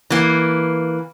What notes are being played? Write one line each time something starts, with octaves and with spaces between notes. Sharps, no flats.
E3 A#3